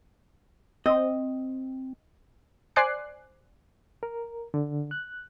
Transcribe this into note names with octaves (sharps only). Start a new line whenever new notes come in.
C4 D#5
C5 D5 G#5 D6 F#6 C7
A#4
D3
F#6